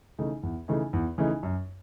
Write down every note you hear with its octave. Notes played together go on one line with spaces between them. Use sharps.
C#3 E3 A3 D#4
E2
C#3 E3 A3 D#4
E2
C#3 E3 A3 D#4
F#2